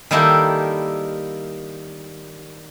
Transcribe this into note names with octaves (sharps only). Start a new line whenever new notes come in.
D#3 G3 A#3 E4 G4 A4